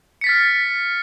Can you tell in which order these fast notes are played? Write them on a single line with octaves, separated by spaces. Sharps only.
C#7 B6 A6 F6